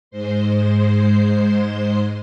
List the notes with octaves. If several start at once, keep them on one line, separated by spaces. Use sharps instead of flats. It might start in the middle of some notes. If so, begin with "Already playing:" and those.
G#2 G#3 C5 C6